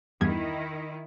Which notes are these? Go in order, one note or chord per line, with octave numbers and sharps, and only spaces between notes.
E2 G2 D#3 E4 G#6